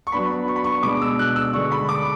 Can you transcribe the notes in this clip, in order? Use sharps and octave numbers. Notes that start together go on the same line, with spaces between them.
C#6
F#3 B3 D4 B5
C#6
B5
C#6
B2 G#3 D4 D6
E6
F#6
E6
D3 G#3 D4 C#6
B5
D6